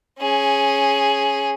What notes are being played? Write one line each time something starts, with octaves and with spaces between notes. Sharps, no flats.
C#4 G#4